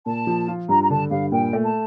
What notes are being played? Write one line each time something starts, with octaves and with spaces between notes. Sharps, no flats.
A#2 A5
F3
F4
G2 A#5
A#5
D3 A5
G2 F5
A#2 G5
A3
A5